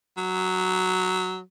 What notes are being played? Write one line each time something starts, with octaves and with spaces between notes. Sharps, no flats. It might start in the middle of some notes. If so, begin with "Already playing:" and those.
F#3